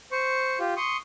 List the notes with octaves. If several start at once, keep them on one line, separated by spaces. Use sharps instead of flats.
C5 C#6
F4 G4
C6 C#6 D#6